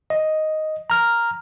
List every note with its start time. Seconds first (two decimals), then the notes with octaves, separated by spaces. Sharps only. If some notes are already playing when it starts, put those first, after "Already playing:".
0.10 D#5
0.90 A#5 F6